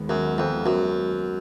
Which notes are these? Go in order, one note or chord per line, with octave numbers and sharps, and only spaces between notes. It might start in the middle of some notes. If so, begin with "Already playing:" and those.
Already playing: D#2 D#3 G#3 B3
F#2
F2
F#2